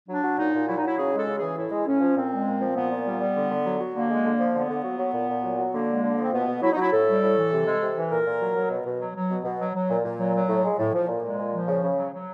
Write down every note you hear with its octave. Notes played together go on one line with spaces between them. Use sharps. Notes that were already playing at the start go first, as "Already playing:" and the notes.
F#3 D4
F#3
A#2 D#4
A#2
F#3 E4
D#4
F#3 E4
C#3 G#4
G#3
A4
C#3
G#4
E3
A2 E4
G#3
A2 C#4
F3
A#2 C4
G#3
A#2
F3
A#2 B3
A#2
G3
G3
D3
D3
F#3
F#3
D3 A#3
G#3
D3
F3
D3 B3
D3
F#3
F#3
A#2
A#2
F#3
F#3
D3 A#3
G#3
D3
F3 C4
B2 B3
B2
F#3 E4
D#4
F#3 E4
A2 A4
G3
A2
E3
C3
G#3
C3
E3
A#2 A#4
A#2
F#3
F#3
B2
B2
F#3
F#3
B2
B2
F#3
F#3
A#2
A#2
F#3
F#3
A2
G#3
A2
F3
A#2
G#3
A#2
F3
C#3
C#3
F#3
F#3